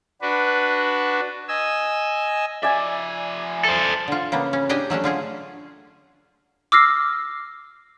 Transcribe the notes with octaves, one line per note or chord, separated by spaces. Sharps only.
D4 F#4 B4
D#5 G#5 E6
F3 D5 E5 G#5
A4 C5
D3 F4
C#3 A#3 B3
C#4
D4 G4 D#5 G5 G#5
F#3 A3 C#4 D4
D3 F4 G#4
D6 E6 F6 A#6 C7